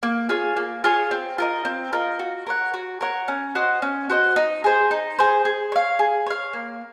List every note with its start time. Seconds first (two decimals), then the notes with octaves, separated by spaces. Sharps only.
0.03 A#3
0.29 F4 G#4 C#5
0.57 A#3
0.84 F4 G#4 C#5
1.11 C4
1.38 F4 A#4 D#5
1.65 C4
1.93 F4 A#4 D#5
2.19 F#4
2.47 A#4 C#5 F#5
2.74 F#4
3.01 A#4 C#5 F#5
3.28 C#4
3.55 F#4 C5 D#5
3.82 C#4
4.10 F#4 C5 D#5
4.36 D#4
4.64 G#4 C5
4.91 D#4
5.19 G#4 C5
5.45 G#4
5.72 C#5 F5
5.99 G#4
6.26 C#5 F5
6.53 A#3